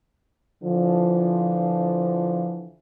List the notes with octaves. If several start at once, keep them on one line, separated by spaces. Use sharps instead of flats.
D3 E3 F3